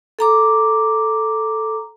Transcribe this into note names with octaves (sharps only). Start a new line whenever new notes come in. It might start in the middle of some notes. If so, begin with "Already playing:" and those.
A4 A#5 D6